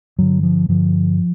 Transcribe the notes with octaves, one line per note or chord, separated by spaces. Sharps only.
G2 D3 F#3
F3
G2 D3 F3